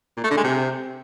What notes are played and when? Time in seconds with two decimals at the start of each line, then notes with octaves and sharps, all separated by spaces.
0.17 A#2
0.24 A3
0.31 D3
0.37 G#3
0.44 C3